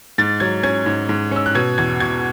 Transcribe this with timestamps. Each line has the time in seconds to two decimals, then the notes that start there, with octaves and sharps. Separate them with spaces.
0.18 G#2 A6
0.40 F#3 G#6
0.63 C#4 G#6
0.86 G#2
1.09 G#2
1.31 C#4 E6
1.46 F#6
1.55 B2 G#6
1.78 E2 G#6
2.00 B2 G#6